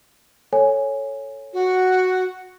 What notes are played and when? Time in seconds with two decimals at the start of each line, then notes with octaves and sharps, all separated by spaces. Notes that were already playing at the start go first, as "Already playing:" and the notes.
0.53 A4 C#5 G#5
1.53 F#4